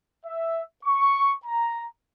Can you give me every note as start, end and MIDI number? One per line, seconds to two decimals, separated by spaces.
0.26 0.62 76
0.85 1.34 85
1.46 1.87 82